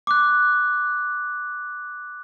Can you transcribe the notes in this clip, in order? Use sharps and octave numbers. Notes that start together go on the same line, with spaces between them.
D6 F#6